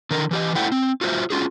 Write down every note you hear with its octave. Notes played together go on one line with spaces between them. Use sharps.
D3 D#3 A#4
E3 G4 D#5
A3 E4 C5 E5 F#5 G5
C4
F4 F#4 A4 C5 E5
C#4 F4 F#4 G#4